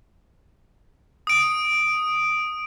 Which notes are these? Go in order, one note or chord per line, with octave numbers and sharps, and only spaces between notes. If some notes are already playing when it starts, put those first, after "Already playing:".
D#6 D7